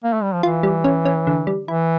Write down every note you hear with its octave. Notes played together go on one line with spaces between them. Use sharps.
A#3
A3
G3
F3
E3 F4
G3
C#4
C#4
D3
G3
E3 E4